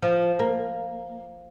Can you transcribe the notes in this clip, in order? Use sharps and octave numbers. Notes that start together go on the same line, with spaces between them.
F3
A#3